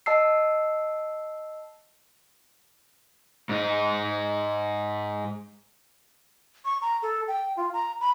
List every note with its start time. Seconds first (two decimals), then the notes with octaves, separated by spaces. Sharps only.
0.06 D#5 A5 E6 C7
3.49 G#2 D#4
6.65 C#6
6.82 A#5
7.02 A4
7.28 G5
7.57 F4
7.74 A#5
8.01 B5